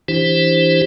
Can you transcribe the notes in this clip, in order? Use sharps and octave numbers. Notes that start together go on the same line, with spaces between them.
E3 D4 E4 G4 C5